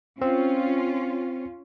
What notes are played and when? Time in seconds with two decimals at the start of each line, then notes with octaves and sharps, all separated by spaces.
0.21 C4 C#4 F4